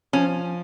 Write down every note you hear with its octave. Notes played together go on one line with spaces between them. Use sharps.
F3 C#4